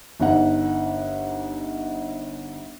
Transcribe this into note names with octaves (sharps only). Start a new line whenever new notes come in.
G1 D#4 F#5